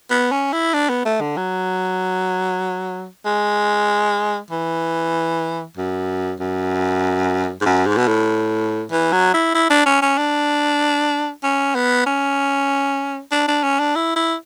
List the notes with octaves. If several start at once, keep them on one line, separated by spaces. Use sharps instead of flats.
B3
C#4
E4
D4
B3
A3
D3
F#3
G#3
E3
F#2
F#2
G#2
F#2
G#2
B2
A2
E3
F#3
E4
E4
D4
C#4
C#4
D4
C#4
B3
C#4
D4
D4
C#4
D4
E4
E4